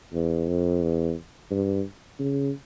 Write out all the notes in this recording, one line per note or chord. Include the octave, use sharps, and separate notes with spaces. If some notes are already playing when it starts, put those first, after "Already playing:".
E2
F2
E2
G2
C#3